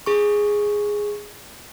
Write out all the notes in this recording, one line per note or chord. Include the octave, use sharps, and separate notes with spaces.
G#4 C#6